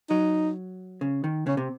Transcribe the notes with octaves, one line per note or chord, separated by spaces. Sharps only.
F#3 D#4
C#3
D#3
C#3 C#4
C3